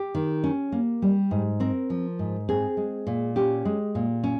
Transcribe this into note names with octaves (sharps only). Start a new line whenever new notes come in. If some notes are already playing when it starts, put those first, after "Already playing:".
Already playing: G4
D#3
C#4
A#3
G3
G#2
C4 A#4
F3
G#2
C4 G#4
G#3
A#2
C#4 G4
G#3
A#2
C#4